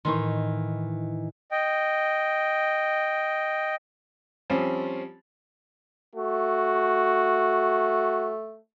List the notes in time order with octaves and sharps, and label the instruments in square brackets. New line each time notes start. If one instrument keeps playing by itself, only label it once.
[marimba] A2 C6 [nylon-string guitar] D#3 E3 D#4
[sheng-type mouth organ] D#5 G5
[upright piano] F3 G3 C4 C#4
[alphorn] A3 [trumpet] F#4